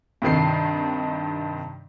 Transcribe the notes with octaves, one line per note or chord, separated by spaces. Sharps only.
G2 C3 D#3 C7